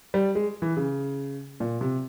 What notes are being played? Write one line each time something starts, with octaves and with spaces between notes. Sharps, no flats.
G3
G#3
E3
C#3
A#2
C3